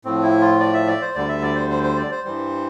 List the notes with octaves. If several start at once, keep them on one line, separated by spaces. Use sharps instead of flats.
A2 F3 C4
E4
F4
D5
E5
D5
C5
D2 D3 G3 D5
E5
D5
C5
C5
C5
D5
C5
G2 E3 G3